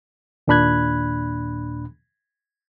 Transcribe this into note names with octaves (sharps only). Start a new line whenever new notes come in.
D#2 A#2 D4 B5 F#6 G#6